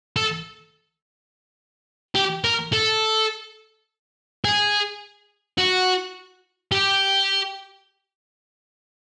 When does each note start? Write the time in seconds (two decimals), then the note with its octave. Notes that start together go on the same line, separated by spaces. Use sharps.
0.16 A4
2.15 G4
2.44 A#4
2.73 A4
4.45 G#4
5.58 F#4
6.72 G4